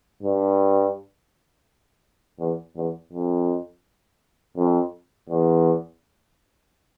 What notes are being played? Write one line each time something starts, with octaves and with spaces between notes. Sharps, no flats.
G2
E2
E2
F2
F2
E2